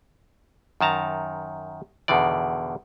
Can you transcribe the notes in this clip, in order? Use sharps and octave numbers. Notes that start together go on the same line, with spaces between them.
F#2 D#3 A5 A#5
E2 B2 D3 D#3 D5